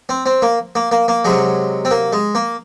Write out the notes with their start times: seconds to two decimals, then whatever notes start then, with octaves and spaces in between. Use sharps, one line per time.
0.09 C4
0.26 C4
0.42 A#3
0.75 A#3
0.92 A#3
1.08 A#3
1.25 C3 F#3 G#3
1.85 C4
1.91 A#3
2.13 G#3
2.35 A#3